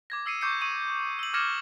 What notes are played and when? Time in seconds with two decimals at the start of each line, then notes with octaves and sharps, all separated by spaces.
0.10 D6 G#6 A#6
0.26 D#6 E6 C7 C#7 D#7
0.41 C#6 D6 G6 C7 C#7
0.61 C#6 D#6 D#7
1.19 E6 F#7
1.34 D6 F6 G#6 A#6 C#7 E7